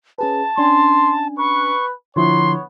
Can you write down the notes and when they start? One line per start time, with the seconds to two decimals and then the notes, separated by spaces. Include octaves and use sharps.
0.18 C#4 G#4 B4 A5
0.58 C#4 D4 G#5 C6
1.37 B4 C#6
2.16 D3 F3 B3 E4 C#5 C6